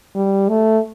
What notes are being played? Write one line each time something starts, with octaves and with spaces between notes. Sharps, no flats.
G3
A3